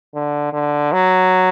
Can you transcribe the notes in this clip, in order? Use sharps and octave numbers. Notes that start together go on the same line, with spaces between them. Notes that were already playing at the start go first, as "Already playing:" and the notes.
D3
D3
F#3